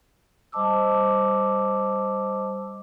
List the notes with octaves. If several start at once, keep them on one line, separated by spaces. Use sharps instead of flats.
G3 C5 D#5 A5 D6 E6